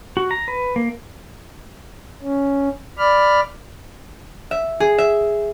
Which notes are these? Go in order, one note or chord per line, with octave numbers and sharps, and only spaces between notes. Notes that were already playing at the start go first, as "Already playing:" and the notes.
F#4
A#5
B4
A#3
C#4
D5 B5 F6
E5
G#4
E5